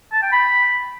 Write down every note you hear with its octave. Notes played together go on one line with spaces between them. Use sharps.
A5
G5
B5